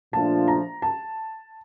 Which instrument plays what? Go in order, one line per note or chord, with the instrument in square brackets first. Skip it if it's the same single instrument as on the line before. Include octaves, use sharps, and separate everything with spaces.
[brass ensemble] A#2 F3 A3 D4 F4 [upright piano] A5
[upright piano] A#5
A5